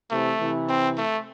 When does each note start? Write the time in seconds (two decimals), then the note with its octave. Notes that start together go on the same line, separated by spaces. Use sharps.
0.11 C3 E3 A3
0.40 C3 E3
0.69 C4
0.98 A3